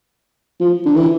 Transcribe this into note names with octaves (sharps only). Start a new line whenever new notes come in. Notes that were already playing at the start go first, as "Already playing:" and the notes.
F3
D3
E3